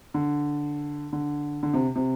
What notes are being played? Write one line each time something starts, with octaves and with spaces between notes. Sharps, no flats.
D3
D3
D3
C3
C3